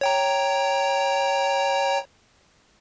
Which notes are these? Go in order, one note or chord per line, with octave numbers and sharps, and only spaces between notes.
C#5 G5 A#5